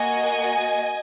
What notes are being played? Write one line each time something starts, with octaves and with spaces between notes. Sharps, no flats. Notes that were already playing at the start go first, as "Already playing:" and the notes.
Already playing: A#3 F#4 D#5 G#5